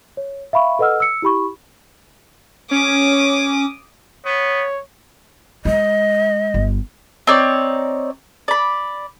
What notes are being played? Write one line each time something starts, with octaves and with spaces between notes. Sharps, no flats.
C#5
E5 F5 B5 C#6
A4 B4 D#5 F#5 E6 F6
E6 C#7
E4 G4 B5 C#6
C#4 D6 D#6
B3 C#5
G#3 D#5
G1
C4 D#4 C#5 D5
D5 B5